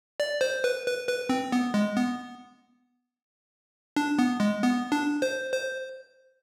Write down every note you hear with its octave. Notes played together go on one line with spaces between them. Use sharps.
D5
C5
B4
B4
B4
C4
B3
G#3
B3
D4
B3
G#3
B3
D4
C5
C5